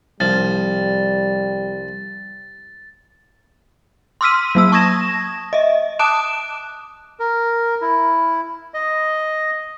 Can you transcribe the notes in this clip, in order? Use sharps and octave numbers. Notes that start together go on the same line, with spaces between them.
C2 F3 G3 A6
C6 D6 E6 F6 B6 D#7
F#3 A#3 E6
A5 C#6 D#6 G#6 A#6 E7
D#5 E5
A5 D6 D#6 F#6 D7 E7
A#4
E4
D#5